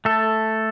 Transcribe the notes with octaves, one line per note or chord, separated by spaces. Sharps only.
A3 A4